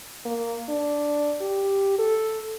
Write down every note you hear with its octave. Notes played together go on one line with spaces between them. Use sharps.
A#3
D4
G4
A4